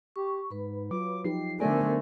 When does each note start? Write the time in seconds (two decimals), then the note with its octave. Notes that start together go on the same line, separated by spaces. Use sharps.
0.16 G4 C#6
0.51 G#2 B4 B5
0.91 F#3 F4 D6
1.24 F3 D#4 G4 C7
1.60 D3 A3 B3 A4 A#4 C5 D5 G#5